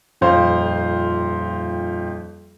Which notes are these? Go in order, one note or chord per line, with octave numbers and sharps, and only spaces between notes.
D#1 F2 C5 F5